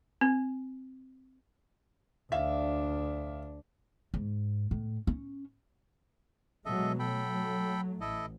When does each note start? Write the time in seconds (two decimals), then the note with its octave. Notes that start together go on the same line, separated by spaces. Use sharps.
0.21 C4
2.32 D2 D4 E5 F5
4.14 G#2
4.71 A2
5.07 C#4
6.65 B2 F#3 G#3 A4 D#5 E5
6.99 F#3 A3 A4 G5 B5
8.01 A1 E4 A4 D#5